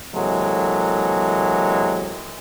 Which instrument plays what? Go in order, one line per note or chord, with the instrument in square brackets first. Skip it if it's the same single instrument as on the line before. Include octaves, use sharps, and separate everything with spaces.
[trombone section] C3 E3 F#3 G#3 A#3 A4